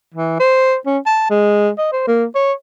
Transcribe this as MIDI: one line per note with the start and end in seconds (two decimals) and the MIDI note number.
0.14 0.35 52
0.40 0.75 72
0.86 0.98 61
1.06 1.30 81
1.30 1.70 56
1.78 1.89 75
1.92 2.04 72
2.08 2.25 58
2.35 2.53 73